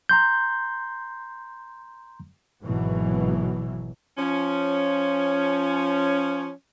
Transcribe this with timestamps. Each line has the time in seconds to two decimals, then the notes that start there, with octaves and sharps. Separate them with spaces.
0.09 A#5 C6 G6
2.64 G#1 B2 E3 F#3
4.17 F3 C#4